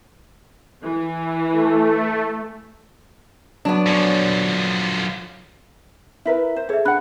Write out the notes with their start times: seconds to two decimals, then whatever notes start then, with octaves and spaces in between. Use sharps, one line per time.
0.83 E3
1.52 A3
3.65 F#3 B3 D4
3.87 D3 F3 C#5 G#5
6.26 E4 A#4 B4 E5 B6
6.56 C5
6.69 G#4 A4 C#5 E5
6.85 D4 F#5 B5 F#6